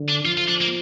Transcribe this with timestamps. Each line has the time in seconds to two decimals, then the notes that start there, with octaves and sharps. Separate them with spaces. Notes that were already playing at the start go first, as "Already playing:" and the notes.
Already playing: D3
0.09 D4
0.25 F3 F4
0.37 F4
0.48 D4
0.61 A#3